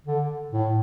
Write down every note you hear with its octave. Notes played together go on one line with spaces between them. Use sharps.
D3
A2